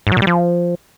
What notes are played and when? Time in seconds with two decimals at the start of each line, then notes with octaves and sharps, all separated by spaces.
0.07 G#2
0.12 F#3
0.17 A#2
0.22 G3
0.27 F3